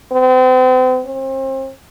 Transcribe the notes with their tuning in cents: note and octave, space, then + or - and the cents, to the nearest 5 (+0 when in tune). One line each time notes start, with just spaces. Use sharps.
C4 -40
C4 +35